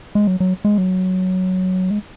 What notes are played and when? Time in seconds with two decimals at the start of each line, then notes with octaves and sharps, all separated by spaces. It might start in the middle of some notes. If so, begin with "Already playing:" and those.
0.15 G#3
0.27 F#3
0.40 F#3
0.65 G#3
0.78 F#3
1.90 G#3